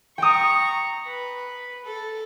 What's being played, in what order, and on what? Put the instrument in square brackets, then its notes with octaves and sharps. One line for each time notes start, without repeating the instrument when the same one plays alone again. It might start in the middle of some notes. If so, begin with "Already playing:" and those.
[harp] G5 D#6 [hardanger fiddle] A#5 C#6
[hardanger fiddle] B4
A4